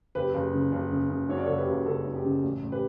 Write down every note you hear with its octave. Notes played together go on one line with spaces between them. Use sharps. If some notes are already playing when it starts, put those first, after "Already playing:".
F#1 G4 B4
F#1
C#3
F#1
C#3
C#3
F#2 C#5
D5
F#1 A4 C#5
G4 B4
F#1
C#3 A4
F#2
G4
C#3
A1
A1
G4 B4